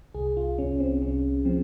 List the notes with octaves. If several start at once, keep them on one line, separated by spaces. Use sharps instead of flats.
C2 G#4
F4
C2 C#4
C4
C2 C#4
F3 C4